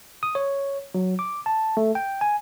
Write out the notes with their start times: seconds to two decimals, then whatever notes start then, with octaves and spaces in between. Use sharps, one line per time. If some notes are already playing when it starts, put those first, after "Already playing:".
0.23 D#6
0.35 C#5
0.95 F#3
1.19 D6
1.46 A5
1.77 A3
1.95 G5
2.21 G#5